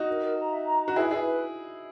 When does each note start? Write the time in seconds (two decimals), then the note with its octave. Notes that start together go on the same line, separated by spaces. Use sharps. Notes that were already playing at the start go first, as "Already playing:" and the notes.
Already playing: D#4 F#4
0.08 A#4
0.22 A#4
0.37 A#5
0.51 E5
0.66 A#5
0.82 A#5
0.88 F#4
0.96 E4 G#4 B4
1.11 E4 G#4 B4